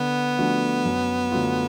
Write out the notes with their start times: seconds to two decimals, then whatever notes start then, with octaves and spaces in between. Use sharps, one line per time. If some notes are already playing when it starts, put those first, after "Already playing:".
Already playing: D3 B3
0.38 F3 A3 D4 F#4
0.85 F#2
1.31 D3 F#3 A3 F4